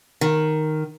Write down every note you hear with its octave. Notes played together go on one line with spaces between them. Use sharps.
D#3